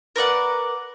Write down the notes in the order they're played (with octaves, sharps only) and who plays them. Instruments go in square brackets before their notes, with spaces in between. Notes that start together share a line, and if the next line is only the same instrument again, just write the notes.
[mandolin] A#4 B4 D5 F#5